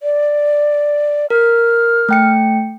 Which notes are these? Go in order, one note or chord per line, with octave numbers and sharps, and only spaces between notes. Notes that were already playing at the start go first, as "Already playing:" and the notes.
D5
A#4 F6
A3 G5 C#7